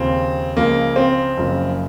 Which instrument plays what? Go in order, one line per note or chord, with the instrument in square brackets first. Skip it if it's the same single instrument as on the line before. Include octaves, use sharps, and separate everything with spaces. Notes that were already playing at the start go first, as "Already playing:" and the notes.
Already playing: [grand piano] D#2 C#3 F3 C4
C#2 C#3 F3 A#3
C4
F#1 F#2 C#3 F3